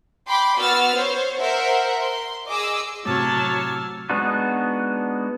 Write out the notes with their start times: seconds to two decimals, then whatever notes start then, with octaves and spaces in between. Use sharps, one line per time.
0.28 G5 B5 C6 D6
0.58 B3 F#4 E6 F6 A6
0.94 C5 C#5
1.39 A#4 C5 E5 F#5
2.01 C6
2.49 G#4 D#5 D6 E6
3.05 A2 C3 F#3 C#5 A5 D6 E6 F6
4.10 G#3 B3 D4 D#4 F#4